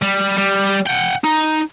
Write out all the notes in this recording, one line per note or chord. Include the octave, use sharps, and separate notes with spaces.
G3
G3
F#5 G5
D#4